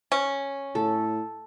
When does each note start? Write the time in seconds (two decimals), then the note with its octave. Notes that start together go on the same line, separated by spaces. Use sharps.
0.12 C#4
0.75 A2 A4